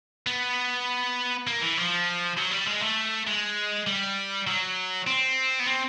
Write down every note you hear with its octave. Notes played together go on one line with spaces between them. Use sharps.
B3
A#3
E3
F3
F#3
G3
G#3
A3
G#3
G3
F#3
C4
B3
C4